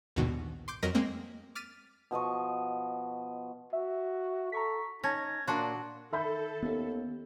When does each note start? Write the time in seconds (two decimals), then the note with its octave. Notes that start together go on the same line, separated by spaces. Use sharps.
0.16 A#1 D#2 G#2 B2 D#3 F#4
0.68 C6 D6 G6
0.82 F2 F#3 A#4 D#5 A#6 B6
0.95 G#3 A#3 C4
1.55 D6 F6 A6 B6 D#7
2.11 B2 F3 D#5 C#6
3.73 F#4 E5
4.52 A4 A#5 C#6 B6
5.04 C#4 D#4 A5 G#6 A#6
5.48 A#2 A#3 D4 F#4 C6
6.13 D#3 A4 E5 B5 G6
6.63 D#2 B3 C#4